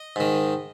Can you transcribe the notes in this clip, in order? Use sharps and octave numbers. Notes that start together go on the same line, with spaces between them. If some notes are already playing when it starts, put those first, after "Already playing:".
Already playing: D#5
G#2 D#3